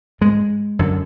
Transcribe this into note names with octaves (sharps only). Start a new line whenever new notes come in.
G#2 G#3
F#2 D3